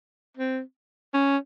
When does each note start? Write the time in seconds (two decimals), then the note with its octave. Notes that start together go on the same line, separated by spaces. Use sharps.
0.37 C4
1.14 C#4